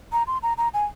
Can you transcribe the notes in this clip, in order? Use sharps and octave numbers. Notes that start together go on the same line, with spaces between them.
A#5
C6
A#5
A#5
G#5